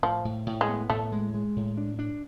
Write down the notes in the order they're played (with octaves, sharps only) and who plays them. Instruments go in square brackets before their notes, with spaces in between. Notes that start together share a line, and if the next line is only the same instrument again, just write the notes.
[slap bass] A2 [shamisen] F3
[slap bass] A2
A2
[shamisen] G#3
[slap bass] B3
[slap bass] A2 [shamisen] A3
[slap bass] G#3
G#3
A2
D4
D4